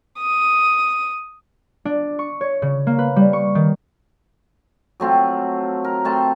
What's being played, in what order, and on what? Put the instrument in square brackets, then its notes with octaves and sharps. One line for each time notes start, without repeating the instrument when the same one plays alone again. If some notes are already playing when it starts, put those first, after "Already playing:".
[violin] D#6
[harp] D4
C#6
C#5
C#3
A#3
B4
G3
C#6
D#3
[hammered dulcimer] F#3 A3 C4 F4
A#4
C3 A3 A5 C6